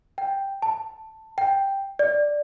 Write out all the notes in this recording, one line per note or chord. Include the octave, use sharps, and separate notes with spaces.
G5
A5
G5
D5